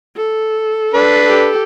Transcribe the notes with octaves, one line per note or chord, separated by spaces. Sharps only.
A4
D4 B4
G4 A4